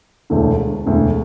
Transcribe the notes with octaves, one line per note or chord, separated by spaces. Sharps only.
E1 D2 D3
E1 D2 D3